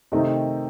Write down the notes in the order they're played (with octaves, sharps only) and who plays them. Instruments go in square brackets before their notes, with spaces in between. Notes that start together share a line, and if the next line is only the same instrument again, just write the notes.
[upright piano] C3 D#3 A3 C4 D#4